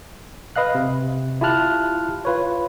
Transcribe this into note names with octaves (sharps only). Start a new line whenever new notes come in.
B4 D#5 F5 F#6
C3
E4 F4 G4 A5 F6 F#6
F4 B4 C#5